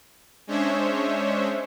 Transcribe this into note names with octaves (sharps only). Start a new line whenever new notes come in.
G#3 C#4 D4 C5 C#5 E5